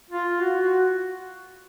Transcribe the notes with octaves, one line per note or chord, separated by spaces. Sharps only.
F4
F#4
F#4